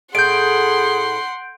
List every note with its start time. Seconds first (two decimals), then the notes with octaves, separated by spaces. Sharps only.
0.15 A2 G#4 F#5 C6 G6 D7